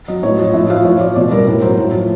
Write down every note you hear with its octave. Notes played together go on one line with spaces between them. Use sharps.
F#3 D#5
A2 C#5
F3 D#5
A2 E5
F3 F5
A2 C#5
F3 D5
B2 D5
G3 A#4
A2 A#4
F#3 C5
A2
F3